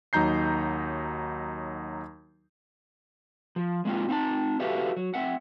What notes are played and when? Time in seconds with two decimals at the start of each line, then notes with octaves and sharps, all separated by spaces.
0.13 D#2 F#3 D#4 A#5 G6 C7
3.56 F3
3.85 G#3 A#3 C4 F4
4.09 C4 D#4 E5 A5
4.60 F#4 G4 A4 B4 E5 F5
4.97 F#3
5.14 C4 E5 F#5